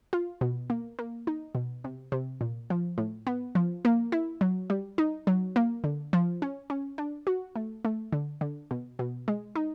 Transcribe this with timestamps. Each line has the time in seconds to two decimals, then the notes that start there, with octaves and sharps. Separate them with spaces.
0.13 F4
0.41 B2
0.70 A#3
0.99 A#3
1.27 D#4
1.55 B2
1.84 C3
2.12 C3
2.41 A#2
2.70 F3
2.98 A2
3.27 B3
3.55 F3
3.85 A#3
4.12 E4
4.41 F#3
4.70 G3
4.98 D#4
5.27 F#3
5.56 A#3
5.84 D3
6.13 F3
6.42 C#4
6.70 C#4
6.98 D4
7.27 F#4
7.55 A3
7.85 A3
8.13 D3
8.41 D3
8.71 B2
8.99 B2
9.28 G#3
9.56 D#4